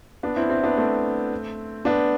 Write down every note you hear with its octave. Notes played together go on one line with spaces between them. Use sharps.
B3 D4
C4 E4
C4 E4
B3 D4
A3 C4
B3 D4